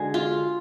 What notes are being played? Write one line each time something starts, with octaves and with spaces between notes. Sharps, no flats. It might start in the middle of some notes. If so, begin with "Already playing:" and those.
Already playing: D3 G#3 D4 F#4 G#4
F4